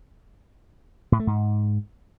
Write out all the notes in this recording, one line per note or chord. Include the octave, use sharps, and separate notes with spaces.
A2
A3
G#2